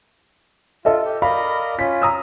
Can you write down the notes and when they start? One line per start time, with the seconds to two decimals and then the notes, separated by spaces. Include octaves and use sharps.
0.85 F4 A4 D#5 E5
1.04 G4
1.22 A#4 D5 D#5 F5 B5
1.79 C#4 F4 B6
2.02 A#5 D#6 E6